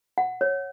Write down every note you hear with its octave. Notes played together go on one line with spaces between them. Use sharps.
F#5
C#5